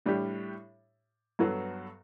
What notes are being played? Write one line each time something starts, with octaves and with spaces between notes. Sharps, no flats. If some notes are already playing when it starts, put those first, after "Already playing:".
A2 G3 D4 G4
G2 F#3 B3 F#4 A4